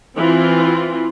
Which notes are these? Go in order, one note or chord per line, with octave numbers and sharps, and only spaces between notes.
E3 C4 F4